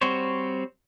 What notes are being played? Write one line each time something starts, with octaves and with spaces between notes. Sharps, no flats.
G3 C4 F#4 C5 C#5